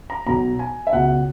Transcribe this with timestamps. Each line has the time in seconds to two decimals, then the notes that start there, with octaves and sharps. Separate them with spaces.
0.10 A#5
0.26 B1 B2 A#5
0.59 G#5
0.87 E5
0.93 C#2 B2 F#5